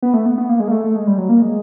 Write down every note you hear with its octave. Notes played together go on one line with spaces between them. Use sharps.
B3
A3
B3
B3
A#3
G#3
A#3
A3
A3
G#3
G3
F#3
A#3
G#3